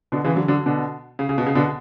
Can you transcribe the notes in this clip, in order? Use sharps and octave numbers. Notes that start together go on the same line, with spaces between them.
B2 D3
C#3 E3
D3 F#3
D3 F#3
B2 D3
C#3
C#3
B2
C#3
B2 D3